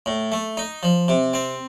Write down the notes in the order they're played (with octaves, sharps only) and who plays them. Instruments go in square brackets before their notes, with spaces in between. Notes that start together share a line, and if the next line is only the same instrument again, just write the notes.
[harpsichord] A2
A3
D#4
F3
C3
C4